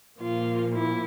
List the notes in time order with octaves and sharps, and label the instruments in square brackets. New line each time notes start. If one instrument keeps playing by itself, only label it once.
[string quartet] A#2 F3 A#3 F4
E4